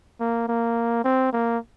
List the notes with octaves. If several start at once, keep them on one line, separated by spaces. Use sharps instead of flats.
A#3
A#3
C4
A#3